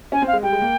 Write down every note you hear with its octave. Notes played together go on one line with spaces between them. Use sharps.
C#4 G#5
C4
F5
G#3
G3 G5
G#3
A#3